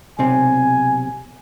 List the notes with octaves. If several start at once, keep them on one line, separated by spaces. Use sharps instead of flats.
B1 C3 C4 G#5